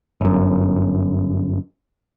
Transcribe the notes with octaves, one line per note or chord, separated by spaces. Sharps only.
G1 F#2